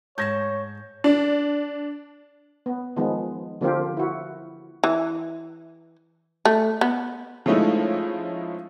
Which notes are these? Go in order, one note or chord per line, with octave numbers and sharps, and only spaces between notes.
G#2 C#5 A5 G6 G#6 A#6
D4
B3
D#3 F3 G#3 B3
D3 F3 A#3 C4 F4 G4
E4 F#4
E3
A3
B3
F3 G#3 A3 C#4 D#4 E4